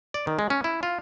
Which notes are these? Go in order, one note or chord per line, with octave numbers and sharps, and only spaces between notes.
D5
D#3
G#3
C#4
E4
F4